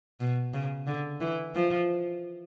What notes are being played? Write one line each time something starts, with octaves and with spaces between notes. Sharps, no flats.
B2
C#3
D3
E3
F3